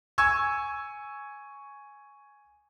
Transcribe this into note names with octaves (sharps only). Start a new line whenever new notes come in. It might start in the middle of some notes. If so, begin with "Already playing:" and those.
G#5 C#6 E6 G#6